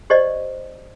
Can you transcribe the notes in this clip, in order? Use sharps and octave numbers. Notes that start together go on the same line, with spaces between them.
G4 C5 D5 D#5